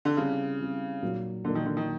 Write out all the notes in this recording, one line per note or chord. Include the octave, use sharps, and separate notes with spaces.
D3
C#3 G3 C4 E4 G#4
G3 C4 E4 G#4
A#2 F#3 A#3 D#4
A#2 D3 F#3 A#3 D#4
D#3
D3
D#3